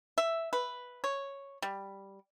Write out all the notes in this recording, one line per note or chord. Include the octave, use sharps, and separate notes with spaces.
E5
B4
C#5
G3